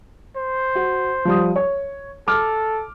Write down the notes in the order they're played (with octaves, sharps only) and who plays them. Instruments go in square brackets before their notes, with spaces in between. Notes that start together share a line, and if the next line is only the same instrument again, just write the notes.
[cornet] C5
[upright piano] F#4
F3 G3 D#6
C#5
[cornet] A4 [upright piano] D6 F6